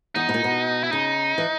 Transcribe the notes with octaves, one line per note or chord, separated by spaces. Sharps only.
E2 D#4
B2
A#2
B2
E4
C#3 D#4
E3